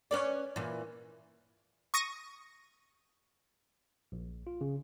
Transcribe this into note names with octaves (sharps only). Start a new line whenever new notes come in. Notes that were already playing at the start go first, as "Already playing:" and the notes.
C#4 B4 D5
A#2 E3
C#6 D#6 A#6 D#7
A#1
F4
C#3